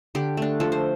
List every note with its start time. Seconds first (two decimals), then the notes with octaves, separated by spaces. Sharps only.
0.15 D3 G4
0.37 A3 D4
0.60 F3 A4
0.72 C5